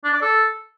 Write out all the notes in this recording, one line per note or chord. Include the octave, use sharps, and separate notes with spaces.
D4
D5
A4